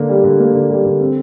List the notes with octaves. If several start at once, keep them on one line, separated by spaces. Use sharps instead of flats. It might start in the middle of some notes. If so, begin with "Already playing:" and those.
Already playing: D3 A#3
G3
D3
A#3
D3
G3
D3
C4